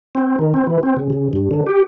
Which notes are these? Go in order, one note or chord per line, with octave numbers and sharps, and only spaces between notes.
C4
D#3
C4
E3
C4
C#3
C#3
G2
D3
G4